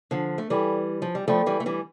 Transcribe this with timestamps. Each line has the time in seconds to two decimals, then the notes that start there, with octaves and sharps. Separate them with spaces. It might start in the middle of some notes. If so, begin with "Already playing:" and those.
0.11 D3 F3
0.38 A3
0.50 E3 G3 A4 D5 G5 B5
1.02 F3
1.15 G3
1.28 F3 A3 A4 D5 G5 B5
1.46 E3 G3
1.60 A3
1.66 E3 G3